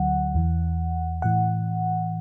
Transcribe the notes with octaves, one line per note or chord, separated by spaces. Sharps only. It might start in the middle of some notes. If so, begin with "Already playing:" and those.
Already playing: D2 D3 F#3 F#5
E2 E3
A2 E3 F#5